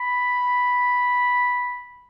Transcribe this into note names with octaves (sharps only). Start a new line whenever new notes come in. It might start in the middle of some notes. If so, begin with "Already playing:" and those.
Already playing: B5